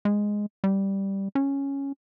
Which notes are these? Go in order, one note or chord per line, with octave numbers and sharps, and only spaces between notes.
G#3
G3
C#4